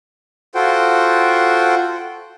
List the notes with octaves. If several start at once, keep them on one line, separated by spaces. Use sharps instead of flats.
F4 F#4 A4 C5 F#5 G5